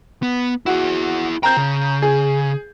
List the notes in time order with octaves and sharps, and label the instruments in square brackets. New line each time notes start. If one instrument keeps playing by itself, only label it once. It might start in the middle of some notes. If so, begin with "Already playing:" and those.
[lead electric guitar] B3
[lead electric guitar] E4 G#4 [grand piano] F#4
[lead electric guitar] C5 G5 [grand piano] A#5 G6
[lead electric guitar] C#3
[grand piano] G#4